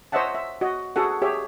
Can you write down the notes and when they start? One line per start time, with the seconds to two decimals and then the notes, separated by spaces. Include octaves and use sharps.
0.12 C5 C#5 D#5 E5 F#5 A5
0.35 E5
0.61 F#4 D#5
0.96 F#4 G#4 A4 F#5
1.22 G4 G#4 C#5 E5